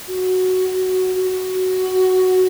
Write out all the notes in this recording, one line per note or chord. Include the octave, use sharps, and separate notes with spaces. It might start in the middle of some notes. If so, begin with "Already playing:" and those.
F#4
F#4